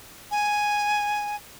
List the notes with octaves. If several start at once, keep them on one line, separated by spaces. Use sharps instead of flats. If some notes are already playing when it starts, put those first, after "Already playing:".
G#5